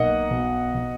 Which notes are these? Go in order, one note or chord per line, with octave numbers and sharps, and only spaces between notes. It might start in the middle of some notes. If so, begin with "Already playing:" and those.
Already playing: B1 A#3 D#5 F#5
B2
B2